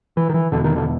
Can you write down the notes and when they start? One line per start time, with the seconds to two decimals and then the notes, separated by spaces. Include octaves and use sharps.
0.17 E3
0.30 D#3
0.34 E3
0.52 E1 E2 B2 D3
0.64 D#3
0.76 D3